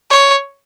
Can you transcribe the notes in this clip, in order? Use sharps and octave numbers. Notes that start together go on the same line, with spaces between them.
C#5